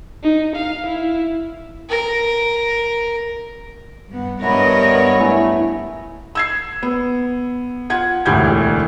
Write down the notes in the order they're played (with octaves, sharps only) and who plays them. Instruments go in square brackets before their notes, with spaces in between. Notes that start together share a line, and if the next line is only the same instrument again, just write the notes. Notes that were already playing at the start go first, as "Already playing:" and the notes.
[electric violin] D#4
F5
E4
[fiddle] A#4
[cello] G2 B3
[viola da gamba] G2 B3 C#5 [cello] A#4 D#5 [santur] E5 F#5 B5
[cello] A3 [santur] E4 G#5
[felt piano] E6 G#6 C7
B3
F4 F#5 G#6
E1 D2 A2 G4 G6 G#6